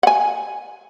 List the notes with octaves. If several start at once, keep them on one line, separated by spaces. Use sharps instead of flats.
F#5 G#5